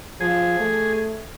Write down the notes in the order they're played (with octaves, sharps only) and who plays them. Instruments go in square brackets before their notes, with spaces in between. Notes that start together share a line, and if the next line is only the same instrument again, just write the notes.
[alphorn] F3 [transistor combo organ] G#4
[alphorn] A3